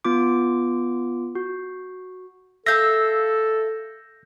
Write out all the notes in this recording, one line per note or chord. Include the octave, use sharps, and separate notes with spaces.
B3 F4 D6
F#4
A4 E5 F5 A5 G6 A#6